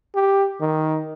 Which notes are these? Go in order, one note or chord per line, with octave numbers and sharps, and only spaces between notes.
G4
D#3